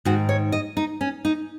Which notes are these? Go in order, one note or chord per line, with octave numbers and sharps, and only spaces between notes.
G#2 D#3 F#4
C#5
D#5
D#4
C#4
D#4